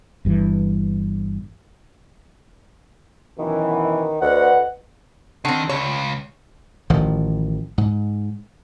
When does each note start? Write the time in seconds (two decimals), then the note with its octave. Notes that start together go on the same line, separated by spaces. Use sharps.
0.25 G1 G2 C#3 E3
3.39 F#2 B2 D#3 E3
4.22 D2 B4 D#5 F#5
5.45 D3 D#3 C4
5.69 C#2 C#5
6.90 A1 D#3 F3
7.78 G#2